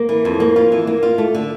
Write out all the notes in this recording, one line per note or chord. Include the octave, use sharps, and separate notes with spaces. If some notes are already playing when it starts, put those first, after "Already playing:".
Already playing: A#3
E3
F2
A#3
F4
E3
A#3
F4
A3
D3